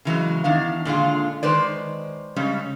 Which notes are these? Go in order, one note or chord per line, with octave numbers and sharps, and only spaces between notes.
C#3 E3 F#3 G#3
E2 D#3 D4 F5
A#2 D3 G#3 F4
D#3 G#3 B4 C5 D5
C#3 G3 G#3 C#4